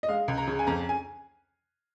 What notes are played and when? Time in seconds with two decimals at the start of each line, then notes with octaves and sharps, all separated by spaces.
0.03 D#5
0.08 G#3 F5
0.28 C#2
0.38 A#5
0.48 C#3
0.59 G#5
0.67 F2 A#5
0.89 G#5